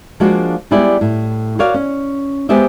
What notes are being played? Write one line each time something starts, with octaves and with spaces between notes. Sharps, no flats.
F3 G#3 A#3 D4 F#4
G3 G#3 B3 E4 G4 D5
A2
F#4 A#4 C#5 D5 F5
C#4
G#3 B3 G4 C5 D#5 E5